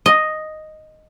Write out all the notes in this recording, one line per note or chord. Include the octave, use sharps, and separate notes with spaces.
D#5